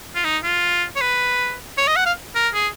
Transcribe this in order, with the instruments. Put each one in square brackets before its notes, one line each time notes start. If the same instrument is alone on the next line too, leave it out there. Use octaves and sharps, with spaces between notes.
[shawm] F4
D#4
F4
C#5
B4
C#5
D#5
F#5
F5
A#4
G#4